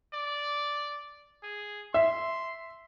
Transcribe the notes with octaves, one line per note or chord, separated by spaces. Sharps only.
D5
G#4
E5 C6